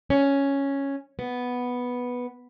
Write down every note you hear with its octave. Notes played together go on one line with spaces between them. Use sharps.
C#4
B3